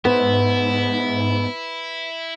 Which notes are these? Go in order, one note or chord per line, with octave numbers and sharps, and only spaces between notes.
G#2 B3 E4 B4 C5